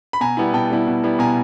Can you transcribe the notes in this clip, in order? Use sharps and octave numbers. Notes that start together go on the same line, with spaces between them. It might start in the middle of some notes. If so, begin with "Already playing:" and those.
B5
B2 G#5 A#5
G3 B3 E4
B2 G5 A5
G3 B3 E4
B2
G3 B3 E4
B2 G#5 A#5